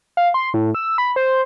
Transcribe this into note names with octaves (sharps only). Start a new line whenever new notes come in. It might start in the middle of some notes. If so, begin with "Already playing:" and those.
F5
C6
A2
E6
B5
C5